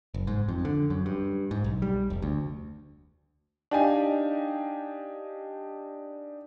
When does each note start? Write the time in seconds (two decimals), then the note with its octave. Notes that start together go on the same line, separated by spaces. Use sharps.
0.14 F#1
0.27 G#2
0.48 F2
0.65 D3
0.90 F#2
1.06 G2
1.51 G#2
1.64 B1
1.82 G3
2.10 F1
2.22 D2
3.71 D4 D#4 G4 D#5 F5 G#5